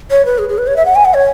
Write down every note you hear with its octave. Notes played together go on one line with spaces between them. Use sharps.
C#5
B4
G#4
G#4
B4
C#5
E5
F#5
G#5
F#5
C#5